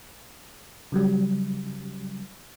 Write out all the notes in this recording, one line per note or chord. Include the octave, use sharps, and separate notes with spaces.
C#3 F#3 G3